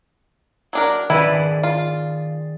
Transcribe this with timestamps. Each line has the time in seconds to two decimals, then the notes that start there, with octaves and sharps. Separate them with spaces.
0.73 F#3 D4 A#4
1.10 D#3 E4 G#4 B4 D5
1.63 F4